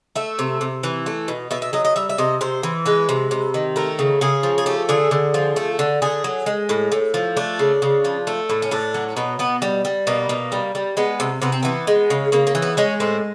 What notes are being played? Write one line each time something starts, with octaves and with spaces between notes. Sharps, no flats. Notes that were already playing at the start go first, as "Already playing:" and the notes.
A3 E5
C3
C3
E3
A3
B2
B2 E5
E5
F#3 D#5
D#5
G3 E5
E5
C3 D#5
C3 C5
E3
G#3 B4
C3
C3
D#3
A3 A#4
C#3
C#3 G#4
F3
G#4
A3 G4
D3 G#4
D3
F3
A3
D3
D3 G#4
F#3
G#3
A2
A2
F3
A3 D4
C#3
C#3
F3
A3
A2
C#4
A2 D4
F#3
B2 B3
B2 B3
G3
G3
B2 A#3
B2
G3
G3
G#3 B3
C3
C3 B3
C4
E3 B3
G#3
C#3
C#3 A#3
A#3
E3
B3
G#3 C#4
A2 C4